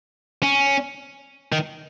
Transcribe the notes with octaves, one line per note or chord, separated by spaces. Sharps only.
C#4
D#3